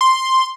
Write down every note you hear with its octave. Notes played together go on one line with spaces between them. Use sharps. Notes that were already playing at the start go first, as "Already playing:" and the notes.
C6